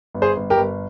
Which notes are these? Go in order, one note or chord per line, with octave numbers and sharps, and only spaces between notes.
G1
G#4 C5
G1
G4 A#4
G1